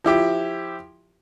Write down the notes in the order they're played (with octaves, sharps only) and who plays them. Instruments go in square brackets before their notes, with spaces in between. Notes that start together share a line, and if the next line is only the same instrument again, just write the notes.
[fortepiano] F3 E4 G4